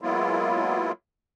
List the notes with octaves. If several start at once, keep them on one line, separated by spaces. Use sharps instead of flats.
F#3 G#3 A#3 B3 E4 F4